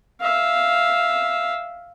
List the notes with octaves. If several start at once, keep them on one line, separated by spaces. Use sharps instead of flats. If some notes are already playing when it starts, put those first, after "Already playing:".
E5 F5